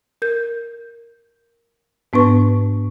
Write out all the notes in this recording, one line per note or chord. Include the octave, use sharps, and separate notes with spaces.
A#4 G6
G#2 B3 D4 B4 C#6